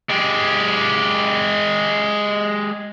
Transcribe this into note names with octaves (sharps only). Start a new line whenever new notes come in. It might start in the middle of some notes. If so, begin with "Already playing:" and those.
G#3 G4